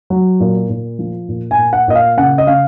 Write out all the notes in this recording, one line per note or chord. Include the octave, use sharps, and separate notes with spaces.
F#3
A#2
A#2
F3
A#2
G#5
A#2
F#5
A#2 D#5
F5
C#3 F#5
D#5
C#3 F5